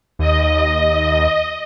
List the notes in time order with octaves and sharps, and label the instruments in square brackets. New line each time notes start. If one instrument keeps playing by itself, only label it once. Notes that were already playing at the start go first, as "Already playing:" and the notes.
[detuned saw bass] D#2 [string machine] D#5